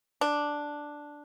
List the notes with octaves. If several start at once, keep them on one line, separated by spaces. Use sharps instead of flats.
D4